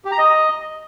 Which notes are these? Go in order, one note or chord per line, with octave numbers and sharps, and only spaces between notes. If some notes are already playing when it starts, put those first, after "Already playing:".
G4
A#5
D#5